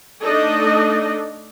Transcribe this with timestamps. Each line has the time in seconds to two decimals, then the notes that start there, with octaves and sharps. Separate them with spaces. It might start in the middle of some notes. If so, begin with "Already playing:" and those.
0.23 A3 D4 D#4 A4 D5 D#5